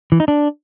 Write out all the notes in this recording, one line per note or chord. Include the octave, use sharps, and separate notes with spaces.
E3
D#4
D4